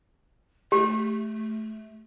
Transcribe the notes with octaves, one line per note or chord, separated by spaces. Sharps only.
A3 G4